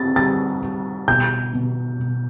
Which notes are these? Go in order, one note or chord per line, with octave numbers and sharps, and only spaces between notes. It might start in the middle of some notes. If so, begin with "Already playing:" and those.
Already playing: C4 A6
G3 A6
G3
B2 G6
B2
B2